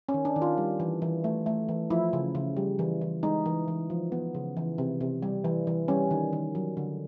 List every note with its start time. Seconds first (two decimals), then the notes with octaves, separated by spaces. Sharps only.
0.09 C#4
0.14 D#3
0.25 D4
0.36 D#3
0.42 F4
0.58 G3
0.80 E3
1.02 E3
1.24 A3
1.46 A3
1.69 E3
1.90 F3 E4
2.13 C#3
2.35 C#3
2.57 G3
2.79 E3
3.01 E3
3.23 G#3 D#4
3.46 E3
3.68 E3
3.90 F3
4.12 B3
4.35 C#3
4.57 E3
4.78 C3
5.01 C3
5.22 G3
5.44 E3
5.67 E3
5.88 G3 C#4
6.11 D#3
6.33 D#3
6.55 F#3
6.77 D3